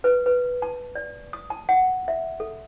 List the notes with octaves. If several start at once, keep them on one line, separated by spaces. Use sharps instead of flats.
B4
B4
A5
D5
D#6
A5
F#5
E5
A4